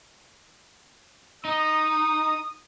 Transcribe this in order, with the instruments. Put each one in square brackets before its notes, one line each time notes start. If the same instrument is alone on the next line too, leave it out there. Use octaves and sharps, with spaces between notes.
[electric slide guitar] D#4 [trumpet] D#6